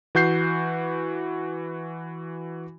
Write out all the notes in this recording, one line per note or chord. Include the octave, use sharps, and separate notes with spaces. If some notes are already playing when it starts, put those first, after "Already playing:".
E3 F#4 G6 C7